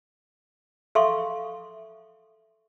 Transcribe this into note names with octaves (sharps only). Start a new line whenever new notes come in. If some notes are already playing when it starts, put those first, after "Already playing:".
A4 E5 F5 C6 C#6